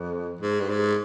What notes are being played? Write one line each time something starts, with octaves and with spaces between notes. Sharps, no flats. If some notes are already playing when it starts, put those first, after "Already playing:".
Already playing: F2
G#2
G2
G#2